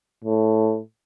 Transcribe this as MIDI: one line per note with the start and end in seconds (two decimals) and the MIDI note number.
0.24 0.79 45